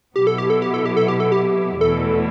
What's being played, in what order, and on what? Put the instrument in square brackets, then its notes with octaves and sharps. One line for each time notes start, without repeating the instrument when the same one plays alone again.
[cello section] B2 F#3 B3 E4 [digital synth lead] G4
[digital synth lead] A4
G4
A4
G4
A4
G4
A4
G4
A4
G4
[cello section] E2 B2 A3 E4 [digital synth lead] A4